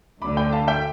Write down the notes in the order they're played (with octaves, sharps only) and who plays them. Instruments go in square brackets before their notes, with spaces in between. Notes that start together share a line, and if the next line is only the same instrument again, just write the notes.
[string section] D2 D3 A3 [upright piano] B5 D6
[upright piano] G5 B5
F5 A5
E5 G5